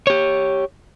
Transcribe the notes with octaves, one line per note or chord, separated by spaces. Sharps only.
G4 C#5